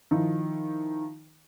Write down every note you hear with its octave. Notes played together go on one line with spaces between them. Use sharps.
D#3 F3 D#4 E4